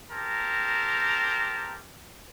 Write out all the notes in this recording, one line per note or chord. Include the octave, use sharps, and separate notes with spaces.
C4 G4 A#4 A5 A#5